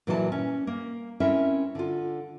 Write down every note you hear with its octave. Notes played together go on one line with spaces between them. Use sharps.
A#2 E3 F#3 E4 C5 A5
C#4
A#3
C4 C#4 E4 A#4 E5
D3 F4